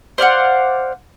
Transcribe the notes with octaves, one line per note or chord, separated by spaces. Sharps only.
C5 D5 F5 F#5